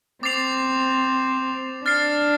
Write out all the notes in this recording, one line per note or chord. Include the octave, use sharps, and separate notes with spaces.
C4 D6 A6 C7 F7
D4 F6 A6 C7